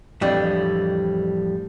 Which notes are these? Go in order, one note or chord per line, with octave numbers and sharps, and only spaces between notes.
F2 A2 E3 G3 D4